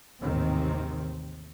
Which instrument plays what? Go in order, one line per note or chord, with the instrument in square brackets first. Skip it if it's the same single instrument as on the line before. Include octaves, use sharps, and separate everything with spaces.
[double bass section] A1 D#2 G#2 C3 D#3 C4